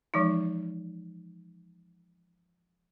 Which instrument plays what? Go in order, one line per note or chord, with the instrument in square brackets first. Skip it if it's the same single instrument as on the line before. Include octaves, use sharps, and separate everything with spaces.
[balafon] E3 F3 G#3 D#4